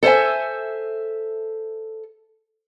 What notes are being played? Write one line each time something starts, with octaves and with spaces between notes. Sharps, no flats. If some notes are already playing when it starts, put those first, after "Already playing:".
A4 C5 C#5 E5 G#5